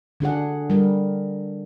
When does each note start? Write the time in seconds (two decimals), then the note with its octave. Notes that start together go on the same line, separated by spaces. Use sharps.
0.20 D3 D4 G#4 F#5
0.70 G3 A#4